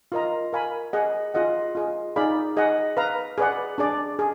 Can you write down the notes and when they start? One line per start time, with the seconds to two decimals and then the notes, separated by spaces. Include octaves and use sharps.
0.12 F4 A#4 D#5 A#5
0.53 A#4 F5 G#5 B5
0.93 G#4 D#5 F#5
1.34 F4 G#4 D#5 F#5
1.75 F4 G#4 D#5
2.16 D#4 G#4 D5 F5 B5
2.57 G#4 D#5 F#5
2.97 B4 F5 A#5
3.38 G#4 B4 D5 F#5
3.78 D4 G#4 D5
4.19 G#4